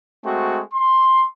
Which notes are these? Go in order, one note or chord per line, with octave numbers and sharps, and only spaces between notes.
G#3 A3 C4 F#4
C6